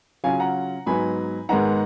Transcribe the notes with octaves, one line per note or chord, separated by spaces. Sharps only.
C#3 F#3 C#4 F4 F5 G#5
F#5 A#5
G#2 F#3 B3 D#4 G#5 B5
G#2 D#3 G#3 B3 D#4 F#5 A#5